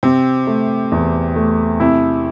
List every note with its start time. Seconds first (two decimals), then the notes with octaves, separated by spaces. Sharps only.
0.03 C3 C4
0.47 A3
0.92 E2
1.36 A3
1.80 C3 E4